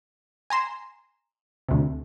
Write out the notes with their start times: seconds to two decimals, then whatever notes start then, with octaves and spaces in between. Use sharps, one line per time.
0.50 G#5 A#5 C6 E7
1.68 D2 C3